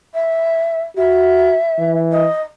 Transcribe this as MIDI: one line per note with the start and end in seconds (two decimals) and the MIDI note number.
0.14 0.82 76
0.97 1.56 66
0.97 1.98 76
1.79 2.28 52
2.11 2.42 75